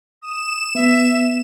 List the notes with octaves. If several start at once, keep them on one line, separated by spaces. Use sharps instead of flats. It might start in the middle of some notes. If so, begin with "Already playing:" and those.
D#6 E7
B3 E5